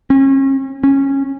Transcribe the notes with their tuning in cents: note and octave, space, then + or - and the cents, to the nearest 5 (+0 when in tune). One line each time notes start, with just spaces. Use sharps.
C#4 -40
C#4 -15